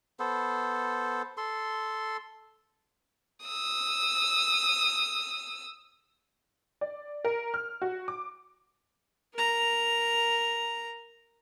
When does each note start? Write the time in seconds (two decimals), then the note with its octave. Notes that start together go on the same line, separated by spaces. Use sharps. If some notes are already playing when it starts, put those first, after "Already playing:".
0.20 B3 A4 C5
1.37 A4 C6
3.45 D#6 E6
6.81 D5
7.25 A#4
7.54 F6
7.82 F#4
8.08 D6
9.34 A#4 A#5